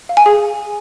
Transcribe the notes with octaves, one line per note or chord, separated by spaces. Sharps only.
F5
G#5
G#4